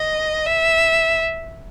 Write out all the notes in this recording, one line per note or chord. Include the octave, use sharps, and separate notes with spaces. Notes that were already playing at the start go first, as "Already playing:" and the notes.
Already playing: D#5
E5